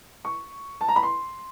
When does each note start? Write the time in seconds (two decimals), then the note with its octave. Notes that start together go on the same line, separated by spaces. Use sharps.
0.25 C#6
0.81 A5
0.88 A#5
0.96 B5
1.03 C6